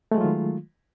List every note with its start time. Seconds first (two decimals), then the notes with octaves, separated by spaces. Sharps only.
0.11 A3
0.15 G#3
0.18 F#3
0.21 F4
0.24 D#3